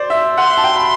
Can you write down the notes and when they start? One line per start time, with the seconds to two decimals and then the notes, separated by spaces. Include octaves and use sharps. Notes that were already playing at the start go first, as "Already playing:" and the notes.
Already playing: C5 D5
0.10 E5
0.37 F#5 C6
0.50 E5
0.58 A5
0.64 G5
0.76 B5